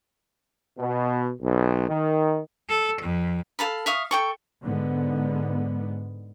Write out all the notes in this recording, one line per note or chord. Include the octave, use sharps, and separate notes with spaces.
B2
B1
D#3
A4
F2
A4 F5 A5 B5
E5 F5 C#6 D#6
A4 G5 C#6
G#2 D3 B3